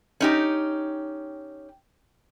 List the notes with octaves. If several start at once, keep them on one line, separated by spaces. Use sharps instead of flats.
C#4 D#4 G4